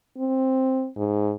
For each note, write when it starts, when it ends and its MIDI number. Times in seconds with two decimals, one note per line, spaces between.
0.18 0.88 60
0.96 1.34 44